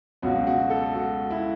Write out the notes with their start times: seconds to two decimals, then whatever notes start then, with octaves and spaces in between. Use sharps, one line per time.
0.22 C#2 B2 F#3 F#4
0.47 F#4
0.70 A4
0.94 F#4
1.30 E4